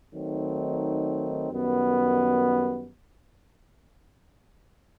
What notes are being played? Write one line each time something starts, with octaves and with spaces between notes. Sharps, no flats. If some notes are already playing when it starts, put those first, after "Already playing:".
D#3 F#3 A3 C4 D#4
F#2 D#3 G3 B3